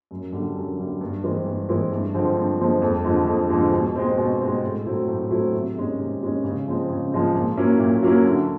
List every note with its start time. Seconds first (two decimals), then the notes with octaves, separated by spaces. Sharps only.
0.11 F#2
0.33 D3 G3
0.56 F#2
0.79 D3 G3
1.01 G2
1.24 E3 G#3 C4 E4
1.46 G2
1.69 E3 G#3 C4 E4
1.92 G2
2.14 D3 F3 G#3 C4
2.37 G2
2.59 D3 F3 G#3 C4
2.82 F2
3.05 D3 F3 G#3
3.27 F2
3.50 D3 F3 G#3
3.73 B2
3.96 G#3 C4
4.18 B2
4.41 G#3 C4
4.63 A2
4.86 F#3 A3 C4 E4
5.08 A2
5.31 F#3 A3 C4 E4
5.54 C3
5.76 D#3 G#3 C#4
5.99 C3
6.22 D#3 G#3 C#4
6.44 C#3
6.67 F3 G#3 C4
6.89 C#3
7.12 F3 G#3 C4
7.35 A#2
7.57 F#3 A#3 C#4 E4
7.80 A#2
8.03 F#3 A#3 C#4 E4
8.25 D3